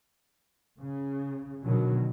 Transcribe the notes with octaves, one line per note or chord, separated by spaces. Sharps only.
C#3
B2 D3 D#3 F#3